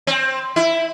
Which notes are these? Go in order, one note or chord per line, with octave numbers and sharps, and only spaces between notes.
C4
E4